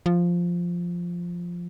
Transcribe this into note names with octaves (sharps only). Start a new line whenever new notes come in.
F3